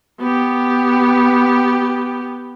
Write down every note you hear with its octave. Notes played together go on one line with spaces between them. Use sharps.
B3 G4